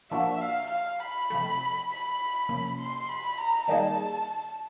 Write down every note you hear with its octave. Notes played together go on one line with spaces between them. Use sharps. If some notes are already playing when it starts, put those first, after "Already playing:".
A#2 F3 A#3 D4 F#4 E5
F5
F5
B5
C3 F3 A3
B5
C3 F3 A#3 C#4
C6
B5
A#5
D#3 G3 A#3 D#4 G#4 A5